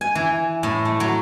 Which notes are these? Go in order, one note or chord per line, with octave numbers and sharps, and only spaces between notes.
G#5
E3
A2
A3
F#3